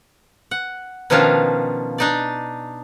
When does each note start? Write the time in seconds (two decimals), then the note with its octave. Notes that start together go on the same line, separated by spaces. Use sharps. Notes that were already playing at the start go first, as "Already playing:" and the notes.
0.51 F#5
1.10 B2 D#3 F3 C#4 D4 F5
1.98 D4 D#4 D5